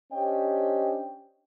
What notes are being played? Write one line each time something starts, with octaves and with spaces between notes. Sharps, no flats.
C#4 D4 G4 C5 D#5 G5